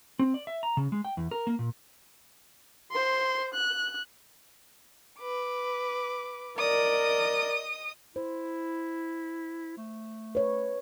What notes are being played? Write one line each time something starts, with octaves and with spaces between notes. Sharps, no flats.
C4
D5
E5
A#5
C#3
G#3
G5
E2
A#4
A#3
A#2
C5 C6
F#6
B4 D6
A#4 D5 D#5 D#6
E4 C5
A3
B4 C#5